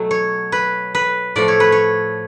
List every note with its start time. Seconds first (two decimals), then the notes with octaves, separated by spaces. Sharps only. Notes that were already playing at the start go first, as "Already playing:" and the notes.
Already playing: B2 F#3 A3
0.11 C#5
0.52 B4
0.95 B4
1.36 A2 F3 A3 D5
1.48 C#5
1.60 B4
1.72 C#5